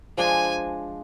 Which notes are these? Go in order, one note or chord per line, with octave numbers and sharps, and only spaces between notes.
F3 G#3 D4 G#5